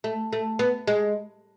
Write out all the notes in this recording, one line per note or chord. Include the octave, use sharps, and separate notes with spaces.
A3
A3
B3
G#3